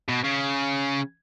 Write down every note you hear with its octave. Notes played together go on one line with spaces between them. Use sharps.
B2
C#3